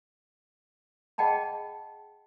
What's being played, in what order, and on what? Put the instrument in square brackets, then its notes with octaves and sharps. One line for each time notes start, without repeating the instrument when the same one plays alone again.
[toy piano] G#4 D#5 F#5 G5 A5 B5